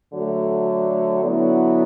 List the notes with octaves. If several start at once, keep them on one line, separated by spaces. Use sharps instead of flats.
D3 F#3 A3
D3 F#3 B3 E4